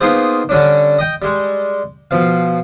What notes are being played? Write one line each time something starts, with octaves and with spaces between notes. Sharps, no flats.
A#3 B3 D#4 F4 G#4 C5
D3 G3 C#4 D4
D#5 G5
G3 G#3
B2 F3 F5